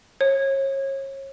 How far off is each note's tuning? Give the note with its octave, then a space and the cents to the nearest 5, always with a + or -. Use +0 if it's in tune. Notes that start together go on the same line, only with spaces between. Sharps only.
C#5 -30